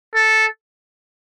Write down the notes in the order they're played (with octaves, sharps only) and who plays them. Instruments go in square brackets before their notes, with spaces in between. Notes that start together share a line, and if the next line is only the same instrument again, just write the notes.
[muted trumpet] A4